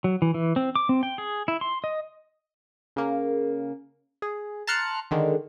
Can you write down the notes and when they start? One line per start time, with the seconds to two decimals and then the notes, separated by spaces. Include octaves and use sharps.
0.04 F#3
0.22 E3
0.34 E3
0.56 C4
0.76 D6
0.89 C4
1.03 G5
1.18 G#4
1.48 E4
1.61 C6
1.84 D#5
2.96 C#3 A#3
4.22 G#4
4.67 A5 A#5 C6 F6 F#6 C#7
5.11 D3 D#3 G#3